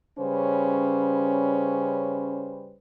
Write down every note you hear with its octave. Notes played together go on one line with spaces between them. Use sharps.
C#3 G3 C#4 B4 C5